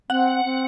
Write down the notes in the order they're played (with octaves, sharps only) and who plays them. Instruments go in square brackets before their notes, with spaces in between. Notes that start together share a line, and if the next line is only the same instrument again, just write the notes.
[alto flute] C4 [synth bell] F#5
[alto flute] C4